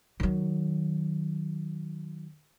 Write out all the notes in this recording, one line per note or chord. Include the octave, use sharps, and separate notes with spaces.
D#3 F#3